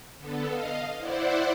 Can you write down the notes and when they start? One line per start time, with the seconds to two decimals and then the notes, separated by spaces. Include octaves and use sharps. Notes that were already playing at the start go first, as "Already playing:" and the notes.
0.18 D3 B3 A4
0.49 D#5 F5
0.97 E4 C5 D5 F#5